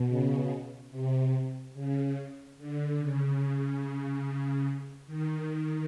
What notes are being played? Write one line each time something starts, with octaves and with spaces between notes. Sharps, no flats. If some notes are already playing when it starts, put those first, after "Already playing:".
Already playing: B2
C#3
C3
C#3
D3
C#3
C#3
D#3
D#3